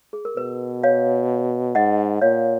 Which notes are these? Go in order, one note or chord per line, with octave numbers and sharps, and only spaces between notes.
G#4
A#4
B2 B4
C#5 F5
G#2 D#5 F#5
A#2 C#5 F5